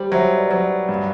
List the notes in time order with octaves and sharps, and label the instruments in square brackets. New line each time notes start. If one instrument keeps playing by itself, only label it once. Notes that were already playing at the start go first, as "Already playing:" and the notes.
Already playing: [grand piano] G3 [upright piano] C5
[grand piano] F#3 [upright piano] C5 E5
[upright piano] B4 D5
[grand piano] F#3
[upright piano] B4 D5
[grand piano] G2